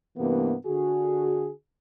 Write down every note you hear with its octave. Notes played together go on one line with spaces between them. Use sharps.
G2 C3 E3 A#3 B3
D3 F#4 G#4